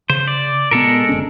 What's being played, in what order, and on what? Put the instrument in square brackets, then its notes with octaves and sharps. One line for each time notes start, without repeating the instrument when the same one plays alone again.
[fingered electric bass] C#3 [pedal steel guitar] C5
[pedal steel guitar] D5
[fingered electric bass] A#2 B3 [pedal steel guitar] G#3 A4 A#4
[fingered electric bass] F#1 D3 C#4